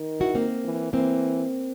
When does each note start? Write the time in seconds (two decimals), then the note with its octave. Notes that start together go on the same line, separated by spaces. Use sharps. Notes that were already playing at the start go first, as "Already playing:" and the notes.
Already playing: D#3
0.20 E4 F#4
0.35 A#3 C4
0.64 E3
0.93 E3 A#3 C4